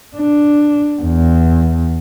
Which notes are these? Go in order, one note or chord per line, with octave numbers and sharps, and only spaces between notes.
D4
E2